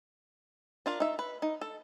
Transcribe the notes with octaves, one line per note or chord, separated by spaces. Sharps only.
D4 F4 A#4
D#4 E5
B4
D#4
A4